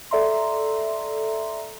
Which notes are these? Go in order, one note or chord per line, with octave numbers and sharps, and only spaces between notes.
A4 D5 E5 A#5 C6